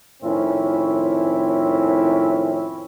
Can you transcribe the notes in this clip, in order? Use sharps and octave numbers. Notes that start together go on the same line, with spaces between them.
F2 A2 D#3 C4 C#4 E4